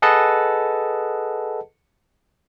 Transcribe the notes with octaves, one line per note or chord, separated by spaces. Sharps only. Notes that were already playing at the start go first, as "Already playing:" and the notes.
G#4 A4 B4 D#5 F#5 A5